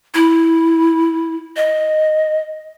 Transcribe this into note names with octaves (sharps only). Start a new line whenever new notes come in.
E4
D#5